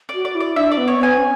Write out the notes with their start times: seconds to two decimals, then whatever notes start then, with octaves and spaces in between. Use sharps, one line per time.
0.09 D5
0.14 F#4
0.25 D5
0.35 E4
0.40 D5
0.56 D4 E5
0.72 D5
0.77 B3
0.88 C#5
0.98 B3 G#5
1.19 C#4